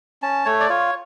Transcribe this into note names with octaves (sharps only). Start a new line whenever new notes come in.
C#4 A5
A3 C#5
D5
F4 C#5